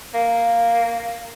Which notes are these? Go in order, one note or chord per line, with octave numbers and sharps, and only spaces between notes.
A#3